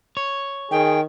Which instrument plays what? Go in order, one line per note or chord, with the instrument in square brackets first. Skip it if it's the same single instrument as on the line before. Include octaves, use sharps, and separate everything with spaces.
[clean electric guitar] C#5
[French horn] D#3 [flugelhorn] G#4 [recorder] G5